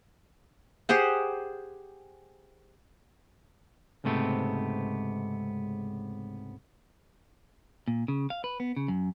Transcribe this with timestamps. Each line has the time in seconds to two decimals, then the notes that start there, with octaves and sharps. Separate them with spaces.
0.89 G4 G#4 C5 F#5
4.04 C#2 G#2 C3 A3 B3 C4
7.88 A#2
8.08 C#3
8.30 F5
8.44 B4
8.60 B3
8.76 C#3
8.88 F#2